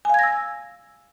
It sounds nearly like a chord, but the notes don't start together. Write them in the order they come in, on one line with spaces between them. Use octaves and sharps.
G#5 F5 G#6 A#6 E6